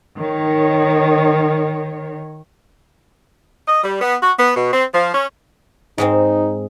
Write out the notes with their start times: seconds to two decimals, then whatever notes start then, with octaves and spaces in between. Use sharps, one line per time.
0.18 D#3 C#5
3.68 D#5
3.84 G3
4.02 B3
4.22 F#4
4.38 B3
4.56 B2
4.73 C4
4.93 F3
5.14 C#4
5.98 G#2 G#3 C4 D#4